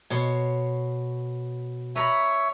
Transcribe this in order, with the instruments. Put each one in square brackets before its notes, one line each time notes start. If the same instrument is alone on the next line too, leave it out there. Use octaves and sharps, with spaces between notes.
[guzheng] B2 C#5 C6
[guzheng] B4 A#5 B5 [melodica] C#5 E5